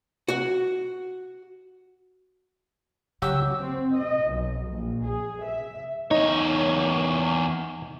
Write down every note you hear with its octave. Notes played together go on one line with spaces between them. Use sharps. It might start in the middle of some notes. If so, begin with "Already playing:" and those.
F#4 F#5
C#3 F#3 F#4 G4 E6
C4
D#5
B1
A#1
G#4
E5
E2 D#4 C#5